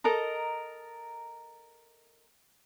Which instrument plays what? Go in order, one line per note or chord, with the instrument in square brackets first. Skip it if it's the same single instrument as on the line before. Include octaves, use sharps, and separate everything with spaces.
[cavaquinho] A4 A#4 D#5 A#5